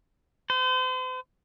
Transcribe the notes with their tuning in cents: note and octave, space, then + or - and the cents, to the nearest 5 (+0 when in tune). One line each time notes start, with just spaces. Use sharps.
C5 -40